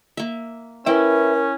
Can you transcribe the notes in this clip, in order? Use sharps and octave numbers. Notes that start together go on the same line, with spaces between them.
A#3 E5
C#4 E4 A#4 B4 E5 G5